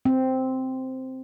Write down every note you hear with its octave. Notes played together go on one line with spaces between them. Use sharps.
C4